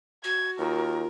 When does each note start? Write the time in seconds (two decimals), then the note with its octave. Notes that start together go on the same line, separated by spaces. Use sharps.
0.24 F#4 G#6
0.59 D#2 F4 A#4